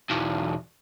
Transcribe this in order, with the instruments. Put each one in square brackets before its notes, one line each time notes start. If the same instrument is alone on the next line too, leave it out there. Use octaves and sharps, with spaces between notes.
[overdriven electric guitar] B1 E2